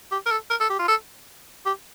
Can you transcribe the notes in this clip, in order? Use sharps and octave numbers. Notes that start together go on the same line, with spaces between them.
G4
A#4
A4
A#4
A4
G4
F4
A4
G4